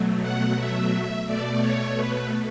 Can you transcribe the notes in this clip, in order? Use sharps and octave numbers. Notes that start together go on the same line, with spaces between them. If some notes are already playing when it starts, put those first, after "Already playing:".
Already playing: B2 F#3 A3
F#5
E5
B2 A3 D5
C#5
B4